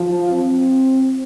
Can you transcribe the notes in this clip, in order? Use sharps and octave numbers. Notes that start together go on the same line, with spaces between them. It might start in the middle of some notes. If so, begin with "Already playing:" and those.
Already playing: F3
C4